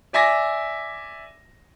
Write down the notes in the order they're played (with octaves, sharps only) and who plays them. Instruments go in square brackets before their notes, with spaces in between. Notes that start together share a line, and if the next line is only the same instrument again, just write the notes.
[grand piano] D5 E5 G#5 D6 A#6